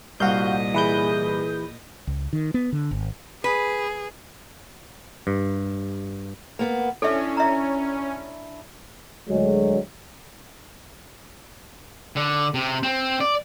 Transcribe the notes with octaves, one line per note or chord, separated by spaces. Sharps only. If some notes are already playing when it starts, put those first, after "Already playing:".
C2 A#2 F#4 D#5 F5 G6
E3 G#4 B4 G6
C#2
D#3
B3
D3
G#1
G#4 B4
G2
A#3 B3
C#4 D4 E4 A4 E5
E5 A#5
D2 F#3 G#3
D3
C3
C4
D5